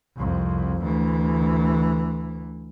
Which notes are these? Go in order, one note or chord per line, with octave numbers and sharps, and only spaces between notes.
C2 F2
D2 E3